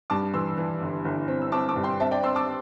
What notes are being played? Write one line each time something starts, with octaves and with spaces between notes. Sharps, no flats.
G2 A5 D6
E3 C6 E6
E3
G1
G1
C4
E6
C4 A5 D6
A5 D6
G2
G5 C6
C4 E5 A5
D5 G5
C4 C6 E6
A5 D6